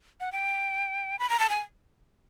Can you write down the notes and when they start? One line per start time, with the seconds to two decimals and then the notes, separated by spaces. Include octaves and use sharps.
0.20 F#5
0.32 G5
1.19 B5
1.30 A#5
1.40 A5
1.49 G#5